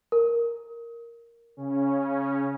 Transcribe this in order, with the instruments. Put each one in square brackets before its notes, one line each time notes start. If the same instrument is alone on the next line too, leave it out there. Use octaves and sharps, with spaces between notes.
[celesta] A#4
[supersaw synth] C#3 C#4